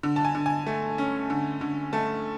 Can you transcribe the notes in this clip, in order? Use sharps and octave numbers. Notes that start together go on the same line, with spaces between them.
D3
A5
G#5
D3
G#5
A3
C#4
D3
D3
A3 A5